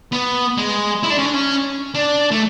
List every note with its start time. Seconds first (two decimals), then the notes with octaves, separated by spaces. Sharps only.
0.12 B3
0.58 G#3
1.03 E4
1.10 D4
1.18 C#4
1.25 D4
1.33 C#4
1.95 D4
2.31 A3